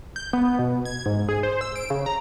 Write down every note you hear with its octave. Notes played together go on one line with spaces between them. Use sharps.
G6
B3
B2
G#6
G#2
G#4
C5
E6
D7
C#3
A#5